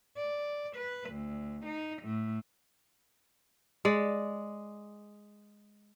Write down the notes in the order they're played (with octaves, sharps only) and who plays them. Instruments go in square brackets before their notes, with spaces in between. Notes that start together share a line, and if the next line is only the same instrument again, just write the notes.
[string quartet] D5
B4
D2
D#4
A2
[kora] G#3 D5